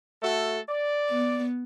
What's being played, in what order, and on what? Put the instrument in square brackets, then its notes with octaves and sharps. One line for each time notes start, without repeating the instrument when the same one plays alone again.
[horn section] A3 F#4 A4
D5
[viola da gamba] B3